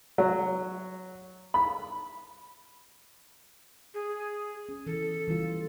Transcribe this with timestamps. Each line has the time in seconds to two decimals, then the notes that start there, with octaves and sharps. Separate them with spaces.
0.18 F#3
1.54 B5
3.94 G#4
4.69 C#4
4.86 E3 A4
5.28 E3 G3 F4